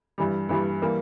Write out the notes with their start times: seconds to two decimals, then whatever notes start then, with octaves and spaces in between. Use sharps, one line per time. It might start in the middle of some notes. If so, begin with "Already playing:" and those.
0.18 G2 E3 G3
0.49 G2 E3 G3
0.82 E3 G3 A#3